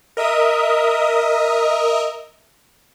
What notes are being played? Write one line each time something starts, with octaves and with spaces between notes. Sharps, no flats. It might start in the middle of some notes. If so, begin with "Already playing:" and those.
A#4 D#5 E5 D#6